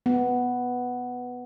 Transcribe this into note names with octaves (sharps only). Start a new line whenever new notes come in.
B3